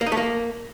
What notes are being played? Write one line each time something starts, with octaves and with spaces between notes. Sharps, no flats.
A#3
D#4
A3
A#3